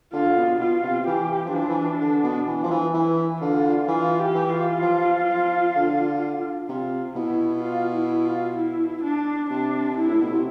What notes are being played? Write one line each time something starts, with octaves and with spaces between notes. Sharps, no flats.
D3 F4
B2
B2 F4
C3
E3 G4
F3
E3 D4
F3
E3
D3
B2
E3
F3
E3
E3 E4
D3 F4
E3 F4
G4
E3
F4
F3
F3
D3
C3 F4
B2 E4
F4
E4
F4
E4
D4
C3 D4
E4
A2
B2
C3